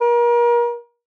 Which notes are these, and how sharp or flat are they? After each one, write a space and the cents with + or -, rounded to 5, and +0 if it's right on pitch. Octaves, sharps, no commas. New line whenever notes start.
A#4 +35